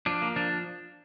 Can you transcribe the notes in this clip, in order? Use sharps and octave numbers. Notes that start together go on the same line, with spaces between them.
F3 D4
A#3
F3 D4